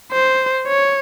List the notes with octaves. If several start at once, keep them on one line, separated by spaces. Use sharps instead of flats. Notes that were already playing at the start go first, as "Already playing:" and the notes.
C5
C#5